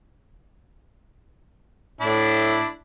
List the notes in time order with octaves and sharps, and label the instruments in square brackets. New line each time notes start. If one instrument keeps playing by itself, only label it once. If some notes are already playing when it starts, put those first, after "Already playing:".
[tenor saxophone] A2 [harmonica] D4 E4